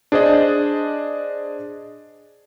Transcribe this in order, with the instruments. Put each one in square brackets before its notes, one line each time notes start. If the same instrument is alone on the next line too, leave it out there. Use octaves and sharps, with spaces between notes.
[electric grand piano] D4 G#4 C5 D5 D#5